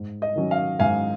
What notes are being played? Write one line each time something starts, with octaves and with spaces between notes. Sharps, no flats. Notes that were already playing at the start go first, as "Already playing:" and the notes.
Already playing: G#2
D#5
D#3 F#3 C#4
F5
G#2 F5 G#5